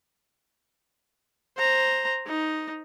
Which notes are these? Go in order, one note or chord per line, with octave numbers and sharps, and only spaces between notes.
C5 A#5
D#4